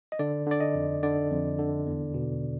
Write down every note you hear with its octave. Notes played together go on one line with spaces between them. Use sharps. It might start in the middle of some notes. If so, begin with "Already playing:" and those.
D#5
D3 D5
D3 D5
D#5
F2
D3 D5
F2
D3
E2
B2